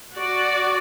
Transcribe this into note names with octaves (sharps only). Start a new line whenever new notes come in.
F#4 D5